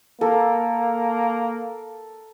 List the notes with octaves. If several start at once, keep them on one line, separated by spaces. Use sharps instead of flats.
A#3 A4 A#4